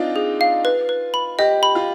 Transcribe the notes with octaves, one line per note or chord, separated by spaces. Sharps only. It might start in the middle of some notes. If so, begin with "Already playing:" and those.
Already playing: C4 D4 D#4 F4
G#4
F5
B4
B4
B5
G4 D#5
B5
F4